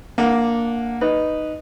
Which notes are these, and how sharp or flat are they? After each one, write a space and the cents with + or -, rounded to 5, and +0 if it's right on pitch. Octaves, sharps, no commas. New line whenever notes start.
A#3 +0 D4 +0 F#5 -20
D#4 -5 B4 +0